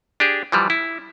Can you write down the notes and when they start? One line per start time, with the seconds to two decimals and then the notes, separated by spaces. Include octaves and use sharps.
0.20 D4 G4 G#4
0.52 E3 F3 G3
0.70 E4